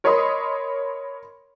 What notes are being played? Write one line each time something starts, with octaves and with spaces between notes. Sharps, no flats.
A#4 C#5 D#5 B5 C6 D#6